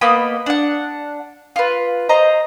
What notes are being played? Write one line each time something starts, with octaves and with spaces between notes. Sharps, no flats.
A#3 B3 D#5 B5
D4 F#5
F4 B4
C5 D#5 A#5